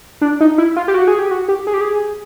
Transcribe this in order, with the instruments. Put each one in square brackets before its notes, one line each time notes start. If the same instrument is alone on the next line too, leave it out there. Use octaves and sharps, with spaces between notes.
[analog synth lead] D4
D#4
E4
F4
G4
F#4
G#4
G4
F#4
G4
G#4
G4
G#4